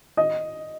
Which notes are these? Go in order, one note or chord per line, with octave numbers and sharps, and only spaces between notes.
D#5